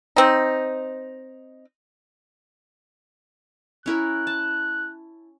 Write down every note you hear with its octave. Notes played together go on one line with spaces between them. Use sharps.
C4 D#4
C#4 E4 A#4 F#6
A5